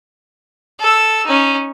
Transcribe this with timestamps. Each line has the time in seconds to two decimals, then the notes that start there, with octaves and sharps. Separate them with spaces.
0.80 A4 E6
1.26 C#4 D#4